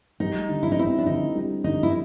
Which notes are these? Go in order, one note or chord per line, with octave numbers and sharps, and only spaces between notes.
G3 D#4
D3
E4
D#4
C4 E4
D4
D3 D#4
G3
D3 D#4
E4